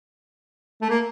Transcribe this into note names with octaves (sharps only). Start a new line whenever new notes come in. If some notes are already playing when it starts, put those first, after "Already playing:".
A3
A#3